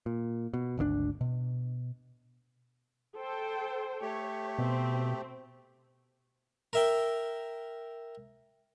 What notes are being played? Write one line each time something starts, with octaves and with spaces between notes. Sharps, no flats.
A#2
B2
G#1 D2 C#3 D4
B2
A4 C5 G5
A3 G4 C#5
B2 C4
A#4 E5 G5